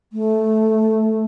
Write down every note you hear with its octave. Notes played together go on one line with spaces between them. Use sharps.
A3